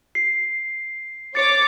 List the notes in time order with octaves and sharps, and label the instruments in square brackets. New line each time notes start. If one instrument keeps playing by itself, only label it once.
[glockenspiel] C7
[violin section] C#5 D6 [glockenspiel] A6 C#7